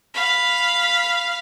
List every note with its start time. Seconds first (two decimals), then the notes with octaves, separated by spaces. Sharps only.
0.14 F5 B5